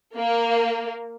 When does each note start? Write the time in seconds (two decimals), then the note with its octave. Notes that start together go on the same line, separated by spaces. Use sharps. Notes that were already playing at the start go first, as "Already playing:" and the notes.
0.17 A#3